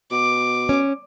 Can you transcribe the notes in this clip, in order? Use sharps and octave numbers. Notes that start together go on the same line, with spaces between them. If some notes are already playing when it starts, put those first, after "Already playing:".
B2 D6
C#4